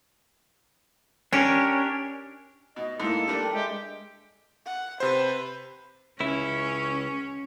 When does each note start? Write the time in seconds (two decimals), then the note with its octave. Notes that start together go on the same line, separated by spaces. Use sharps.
1.33 C#4 D4 G4 A#4
2.76 B2 D#5
3.00 G#2 A#3 E4 A4
3.28 G3 A3 D4 A#4
3.43 G5
3.55 G#3 G4 E5
4.66 F#5
5.00 C3 B4 C5
6.20 C#2 C#4 E4